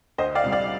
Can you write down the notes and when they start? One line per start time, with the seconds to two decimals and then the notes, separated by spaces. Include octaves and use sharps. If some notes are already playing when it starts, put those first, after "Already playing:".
0.18 D2 C5 D#5
0.35 D5 F5
0.44 C3 G3
0.52 D5 F5